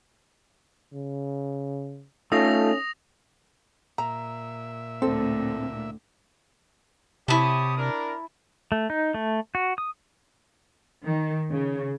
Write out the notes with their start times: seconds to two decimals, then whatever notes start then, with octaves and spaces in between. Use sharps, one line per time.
0.93 C#3
2.32 A3 C#4 D#4 F4 A4 D#6 A#6 F7
3.98 A#2 E5 A#5
5.02 D2 A2 D3 C4 A4
7.28 C3 E4 G4 C#5 A5 D#6
7.77 D4 A#4
8.72 A3
8.90 D#4
9.14 A3
9.55 F#4
9.78 D#6
11.04 D#3
11.50 C#3